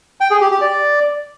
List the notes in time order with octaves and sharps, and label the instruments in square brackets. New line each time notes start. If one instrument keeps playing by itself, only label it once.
[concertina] G5
G#4
G4
G4
D5